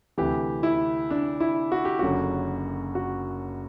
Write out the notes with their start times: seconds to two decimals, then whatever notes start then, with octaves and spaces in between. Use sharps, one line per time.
0.18 D2 C3 E3 G4
0.63 E4
1.11 D4
1.40 E4
1.72 F#4
1.85 G4
1.99 F#1 F#2 D3 F#4
2.95 F#4